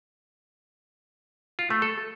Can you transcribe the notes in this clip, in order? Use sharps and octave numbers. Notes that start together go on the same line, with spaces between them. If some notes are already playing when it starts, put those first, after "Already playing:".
F4
A3
A4